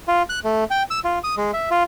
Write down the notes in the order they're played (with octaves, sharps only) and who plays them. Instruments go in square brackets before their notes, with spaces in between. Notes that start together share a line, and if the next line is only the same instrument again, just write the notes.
[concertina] F4
F#6
A3
G5
E6
F4
D#6
G#3
E5
F4